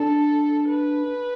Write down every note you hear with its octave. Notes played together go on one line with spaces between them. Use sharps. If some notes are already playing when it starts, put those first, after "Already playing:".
Already playing: D4 A4
B4